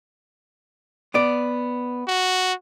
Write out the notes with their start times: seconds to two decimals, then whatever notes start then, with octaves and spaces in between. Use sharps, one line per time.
1.14 B3 D5
2.08 F#4